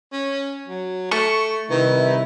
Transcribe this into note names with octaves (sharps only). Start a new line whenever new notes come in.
C#4
F#3
A3 C#6
C3 D#3 G3 E4 B4